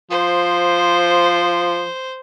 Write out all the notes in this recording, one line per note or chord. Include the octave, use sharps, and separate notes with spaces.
F3 C5